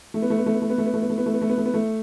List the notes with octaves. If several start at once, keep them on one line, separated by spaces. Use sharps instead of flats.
A3
B3
A3
B3
A3
B3
A3
B3
A3
B3
A3
B3
A3
B3
A3
B3
A3
B3
A3
B3
A3